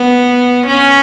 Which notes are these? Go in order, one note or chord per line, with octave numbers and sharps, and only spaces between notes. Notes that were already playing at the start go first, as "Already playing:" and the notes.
Already playing: B3
C#4